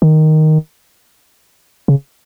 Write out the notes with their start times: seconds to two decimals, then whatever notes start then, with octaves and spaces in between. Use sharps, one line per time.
0.02 D#3
1.88 C#3